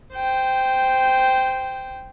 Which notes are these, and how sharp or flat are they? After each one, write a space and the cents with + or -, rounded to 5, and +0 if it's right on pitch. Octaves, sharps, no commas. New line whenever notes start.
C5 -15 G5 +0